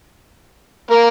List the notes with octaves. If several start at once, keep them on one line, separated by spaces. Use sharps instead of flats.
A#3 A#4